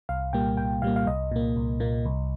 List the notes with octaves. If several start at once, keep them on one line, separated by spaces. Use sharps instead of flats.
C2 F5
A#2 G3 A#3 G5
C2 G5
A#2 G3 A#3 F5
F5
C2 D#5
A#2 A#3
C2
A#2 A#3
C2